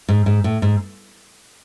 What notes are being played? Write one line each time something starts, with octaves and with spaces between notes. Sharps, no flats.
G#2
G#2
A2
G#2